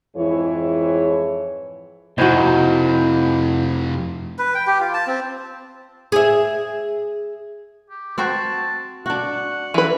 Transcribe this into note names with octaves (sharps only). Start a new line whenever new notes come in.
F2 G#2 E3 E4 G#4 C#5
F2 C3 D#4 E4 F#4 C5 D#5
B4
G5
G4
F4
A5
C4
G#4 E5
G4
C4 F#4 C5 A5
D4 F#4 F#5
E3 B4